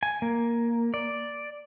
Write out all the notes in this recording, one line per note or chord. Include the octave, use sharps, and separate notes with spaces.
G#5
A#3
D5